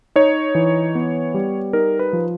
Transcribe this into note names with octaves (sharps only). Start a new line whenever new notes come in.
D#4 C#5
E3
B3
G3
D#4 A#4
B4
F3